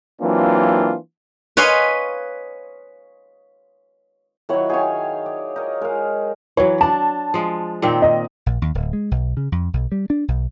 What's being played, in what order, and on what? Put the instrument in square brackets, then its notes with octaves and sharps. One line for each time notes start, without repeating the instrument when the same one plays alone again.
[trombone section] E3 F#3 A#3 C4 D4 F4
[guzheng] B4 C#5 D#5 F5 G#5 C6
[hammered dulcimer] D#3 F#3 [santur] E4 C#5 F#5
[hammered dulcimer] G#4 [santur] C#5 F5 G5
[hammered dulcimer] D5
D#4 A#4
[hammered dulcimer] G#3 F5 [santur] A#4
[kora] E3 F#3 [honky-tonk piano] C#5
[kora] D4 [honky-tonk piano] A5
[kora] F3 G#3
A#2 D#3 C4
[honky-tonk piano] D#5
[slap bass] A#1
D#2
D1
G#3
B1
C#3
F2
B1
G3
D4
B1